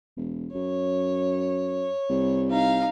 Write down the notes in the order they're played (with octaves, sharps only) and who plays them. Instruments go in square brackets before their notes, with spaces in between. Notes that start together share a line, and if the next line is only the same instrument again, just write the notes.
[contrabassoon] E1
[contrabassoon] F#2 [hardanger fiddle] C#5
[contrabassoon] C2
[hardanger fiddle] D#4 F5